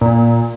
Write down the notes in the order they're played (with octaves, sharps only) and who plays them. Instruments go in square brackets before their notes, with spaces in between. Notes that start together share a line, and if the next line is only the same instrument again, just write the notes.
[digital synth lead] A#2